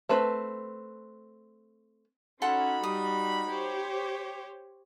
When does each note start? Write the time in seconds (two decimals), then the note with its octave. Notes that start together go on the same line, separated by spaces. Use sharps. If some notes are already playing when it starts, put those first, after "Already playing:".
0.09 A3 C4 B4
2.42 C#4 D#4 F#4 A4 F#5 B5 C6
2.84 G3 D#6
3.47 G4 C5 C#5